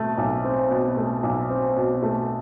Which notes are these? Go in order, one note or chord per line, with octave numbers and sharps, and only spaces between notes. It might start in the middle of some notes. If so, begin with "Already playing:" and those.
Already playing: B2 A3 C4
B1
C4
B2
A3
B1
C4
B2
A3